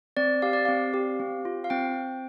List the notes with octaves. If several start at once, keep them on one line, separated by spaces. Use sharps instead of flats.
C4 D5
G4 F5
D5
C4 F5
G4
C4
F4
F5
C4 G5